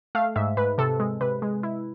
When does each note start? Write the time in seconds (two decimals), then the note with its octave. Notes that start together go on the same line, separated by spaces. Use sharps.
0.15 A3 F5
0.36 G#2 E5
0.57 G#2 B4
0.78 C3 A4
1.00 G#3
1.21 C3 B4
1.42 G#3
1.63 E4